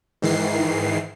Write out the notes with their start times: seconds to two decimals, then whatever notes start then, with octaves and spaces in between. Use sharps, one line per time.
0.22 G#2 D#3 E3 C7